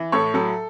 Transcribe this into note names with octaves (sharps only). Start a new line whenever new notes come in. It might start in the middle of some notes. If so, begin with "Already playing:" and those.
Already playing: E3
A2 A4 C#5
F#3 A4